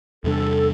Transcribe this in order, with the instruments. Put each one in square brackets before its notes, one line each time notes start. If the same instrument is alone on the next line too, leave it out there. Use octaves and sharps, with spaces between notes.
[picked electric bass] E2 C3 G3 D4 [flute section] A4